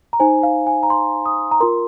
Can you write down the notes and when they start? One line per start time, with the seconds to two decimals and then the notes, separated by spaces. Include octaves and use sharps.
0.13 A#5
0.20 D#4 C5 G#5
0.43 F5
0.67 G#5
0.83 A#5
0.90 C6
1.26 D#6
1.51 A#5
1.60 F4 A#4 C6